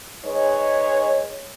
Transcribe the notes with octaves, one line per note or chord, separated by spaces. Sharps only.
G#3 D#4 B4 C#5